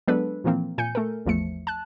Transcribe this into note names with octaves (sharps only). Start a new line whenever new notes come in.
F#3 G#3 B3 D4 A4 B4
A#2 E3 F3 A#3 C4
A#2 G#5 G6 C#7
A3 A4 A#4
A1 E2 F3 A3 C#7
A5 F#6